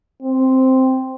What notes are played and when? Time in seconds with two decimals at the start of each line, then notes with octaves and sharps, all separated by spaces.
0.22 C4